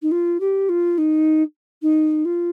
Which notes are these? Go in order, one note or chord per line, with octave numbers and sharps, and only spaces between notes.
D#4
F4
G4
F4
D#4
D#4
F4